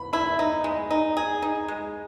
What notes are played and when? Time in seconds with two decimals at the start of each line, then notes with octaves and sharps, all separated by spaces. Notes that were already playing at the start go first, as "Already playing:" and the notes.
Already playing: B5
0.13 E4 B5
0.39 D#4
0.64 G#3
0.90 D#4
1.17 G#4
1.42 D#4
1.68 G#3